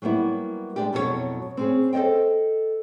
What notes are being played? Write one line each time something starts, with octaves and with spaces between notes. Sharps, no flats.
F#3 G3 A#3 B3 E4
G#3 D4 G4
F2 B2 F#3 E4 G#4 C#5
C4 C#4 G#4
A4 C5 C#5 D#5 G5